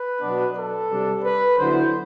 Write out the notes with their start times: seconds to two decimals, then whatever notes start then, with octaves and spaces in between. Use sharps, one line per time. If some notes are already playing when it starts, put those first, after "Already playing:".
Already playing: B4
0.21 B2 F#3 B3 D4
0.55 A4
0.90 C3 G3 D4
1.24 B4
1.58 D3 F#3 B3 E4 C5